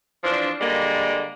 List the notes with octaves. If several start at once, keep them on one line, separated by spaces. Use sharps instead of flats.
E3 F3 C4 D4
D3 G3 G#3 A#3